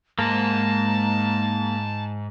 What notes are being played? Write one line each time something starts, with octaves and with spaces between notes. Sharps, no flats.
G#2 A#3 A5